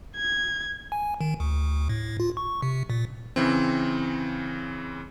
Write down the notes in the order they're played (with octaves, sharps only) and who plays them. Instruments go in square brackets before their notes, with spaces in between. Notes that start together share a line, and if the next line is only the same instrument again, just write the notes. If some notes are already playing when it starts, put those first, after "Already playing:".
[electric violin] G#6
[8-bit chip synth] G#5
D#3
D2
A2
F4
C#6
C3
A#2
[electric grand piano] C#3 E3 C4